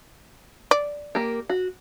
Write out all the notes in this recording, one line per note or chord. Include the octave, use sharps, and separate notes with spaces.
D5
A#3 G4
F#4